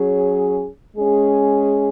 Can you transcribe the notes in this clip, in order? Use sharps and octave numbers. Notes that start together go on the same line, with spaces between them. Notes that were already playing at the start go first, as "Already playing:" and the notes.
Already playing: F#3 C#4 G#4
G#3 C#4 G#4